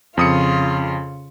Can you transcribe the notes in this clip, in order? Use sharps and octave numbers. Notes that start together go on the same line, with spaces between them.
F2 C#3 F4 D#6 C#7